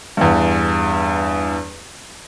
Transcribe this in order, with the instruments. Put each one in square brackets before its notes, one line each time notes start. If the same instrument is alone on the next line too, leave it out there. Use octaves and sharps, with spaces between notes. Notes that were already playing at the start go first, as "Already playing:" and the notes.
[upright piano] E2 G2